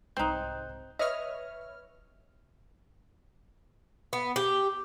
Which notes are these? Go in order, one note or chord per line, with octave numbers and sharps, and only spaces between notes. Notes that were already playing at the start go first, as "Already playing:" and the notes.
C2 G#2 C4 D#4 F#6 G6
B4 C#5 D#5 E5 F6
B3
G4